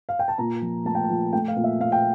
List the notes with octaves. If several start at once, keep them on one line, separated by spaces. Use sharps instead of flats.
F5
G5
A5
A#2 A#5
F3
A3 A5
G5
A5
F3
A3 G5
F5
A#2
E5
A#2 F5
G5